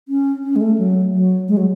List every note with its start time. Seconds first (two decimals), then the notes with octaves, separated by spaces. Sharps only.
0.08 C#4
0.43 C#4
0.56 G#3
0.61 A3
0.78 F#3
1.13 F#3
1.48 G#3
1.57 F#3